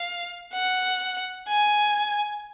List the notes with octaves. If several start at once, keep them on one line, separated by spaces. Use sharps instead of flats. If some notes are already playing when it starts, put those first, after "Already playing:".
Already playing: F5
F#5
G#5